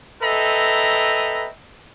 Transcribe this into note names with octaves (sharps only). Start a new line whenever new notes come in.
A4 B4 D#5 E5 G5 A#5